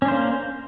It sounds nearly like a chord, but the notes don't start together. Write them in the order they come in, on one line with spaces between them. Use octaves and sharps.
C#4 D4 C5 A#3